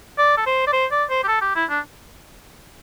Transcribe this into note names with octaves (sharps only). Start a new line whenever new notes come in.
D5
A4
C5
D5
C5
D5
C5
G4
A4
G4
E4
D4